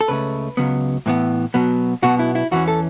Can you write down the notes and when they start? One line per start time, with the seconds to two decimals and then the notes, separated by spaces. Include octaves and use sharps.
0.01 A4
0.08 C#2 C#3 A3 B4
0.57 C#2 C#3 F#3 B3
1.06 A2 E3 B3
1.54 B2 F#3 B3
2.02 B1 B2 B3 F#4
2.19 E4
2.35 E4
2.51 E2 E3 C#4 F#4
2.68 A4